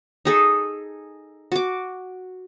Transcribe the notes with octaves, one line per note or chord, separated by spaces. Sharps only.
D#4 G#4 A4
F#4 D6